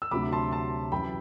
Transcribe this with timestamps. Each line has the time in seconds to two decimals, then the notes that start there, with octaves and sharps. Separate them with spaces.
0.02 E6
0.11 D2 C3 F#3 B5 D6
0.32 A5 C6
0.52 A5 C6
0.92 F#2 E3 G5 B5